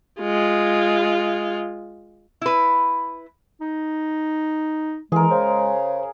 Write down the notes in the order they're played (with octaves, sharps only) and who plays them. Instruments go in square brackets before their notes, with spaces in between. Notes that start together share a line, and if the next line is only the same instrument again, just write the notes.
[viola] G#3 F4
[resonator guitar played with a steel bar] E4 B4
[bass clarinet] D#4
[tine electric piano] E3 [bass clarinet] G#3 [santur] G#4 A#4
[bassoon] C#3 [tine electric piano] C5